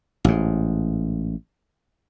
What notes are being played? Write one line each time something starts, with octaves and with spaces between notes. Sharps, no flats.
A1 G#2